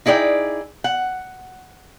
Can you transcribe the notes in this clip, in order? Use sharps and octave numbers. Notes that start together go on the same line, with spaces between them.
D#4 E4 G#4 D5 G5
F#5